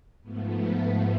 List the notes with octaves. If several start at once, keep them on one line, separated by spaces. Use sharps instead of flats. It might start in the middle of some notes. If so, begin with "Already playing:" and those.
G#2 F3 A3 B3